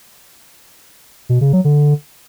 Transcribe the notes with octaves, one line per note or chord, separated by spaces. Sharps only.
B2
C#3
F#3
D3